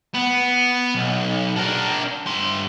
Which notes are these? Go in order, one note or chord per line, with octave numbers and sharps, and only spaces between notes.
B3
B1
D4 A#4
G2 C6